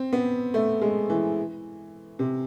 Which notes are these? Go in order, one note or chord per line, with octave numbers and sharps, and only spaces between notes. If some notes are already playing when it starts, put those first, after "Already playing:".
Already playing: C4
B3
A3
G#3
E3
C3